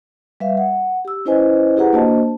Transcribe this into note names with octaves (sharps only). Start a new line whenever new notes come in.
G3 B4 E5 F5
F#5
G4 E6
C#4 E4 B4 C5 D#5 G#5
E4 G4 G#4 B4 F#5 A#5
A#3 D4 F#4 C5 D#5 A5